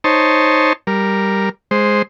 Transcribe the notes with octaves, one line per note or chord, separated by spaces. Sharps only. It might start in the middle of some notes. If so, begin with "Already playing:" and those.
D#4 C5 C#5 A5
G3 A#4
G#3 C5